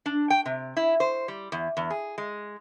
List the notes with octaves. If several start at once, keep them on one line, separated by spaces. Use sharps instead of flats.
D4
G5
C3
E4
C5
G3
E2
E2
G#4
G#3